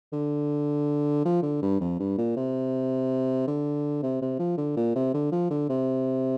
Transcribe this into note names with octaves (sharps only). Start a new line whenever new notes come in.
D3
F3
D3
G2
F2
G2
A#2
C3
D3
C3
C3
F3
D3
A#2
C3
D3
F3
D3
C3